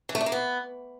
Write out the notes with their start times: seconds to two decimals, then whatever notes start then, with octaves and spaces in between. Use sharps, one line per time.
0.09 E3
0.15 A3
0.21 D4
0.26 A#3
0.32 B3